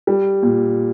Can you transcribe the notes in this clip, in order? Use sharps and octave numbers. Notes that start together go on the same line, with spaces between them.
G3
A#2